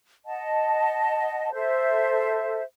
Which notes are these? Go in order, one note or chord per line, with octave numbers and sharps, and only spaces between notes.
D#5 F#5 A5
A4 C5 E5